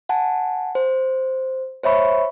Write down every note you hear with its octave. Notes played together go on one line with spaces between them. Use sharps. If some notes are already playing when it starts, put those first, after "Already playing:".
F#5 G#5 A5
C5
C5 C#5 E5 B5 C#6